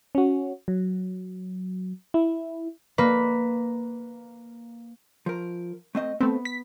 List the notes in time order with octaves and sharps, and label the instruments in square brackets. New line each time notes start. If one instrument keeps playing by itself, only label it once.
[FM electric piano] C#4 F#4
F#3
E4
[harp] A#3 B4
[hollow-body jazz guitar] F3 A#4
A3 C4 D#5
[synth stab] A3 C4 [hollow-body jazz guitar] B3
[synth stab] B6